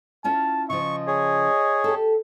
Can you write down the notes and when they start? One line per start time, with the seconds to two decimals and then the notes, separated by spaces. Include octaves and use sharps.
0.24 C#4 E4 F4 A5
0.70 C#3 F3 D#5 C#6
1.07 G#4 C#5
1.84 G4 A4